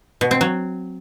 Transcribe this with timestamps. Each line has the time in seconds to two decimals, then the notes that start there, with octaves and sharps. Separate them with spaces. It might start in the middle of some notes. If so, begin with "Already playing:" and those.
0.21 B2
0.31 C4
0.41 F#3